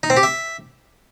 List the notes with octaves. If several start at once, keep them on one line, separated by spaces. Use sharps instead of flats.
D#4
C4
G4
E5